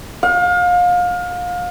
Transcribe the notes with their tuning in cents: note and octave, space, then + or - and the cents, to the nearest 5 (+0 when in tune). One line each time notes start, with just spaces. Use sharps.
F5 +30